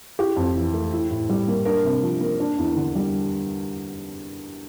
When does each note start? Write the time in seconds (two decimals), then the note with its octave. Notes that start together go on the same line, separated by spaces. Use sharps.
0.19 E4 G4
0.36 F2
0.55 E3
0.73 A3
0.93 E4
1.10 A2
1.29 G3
1.48 A#3
1.65 D4 A#4
1.84 C3
2.03 F3
2.21 A#3
2.40 D4
2.58 E2
2.76 D3
2.95 G3